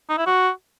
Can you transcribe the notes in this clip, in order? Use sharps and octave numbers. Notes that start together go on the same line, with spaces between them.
D#4
E4
F#4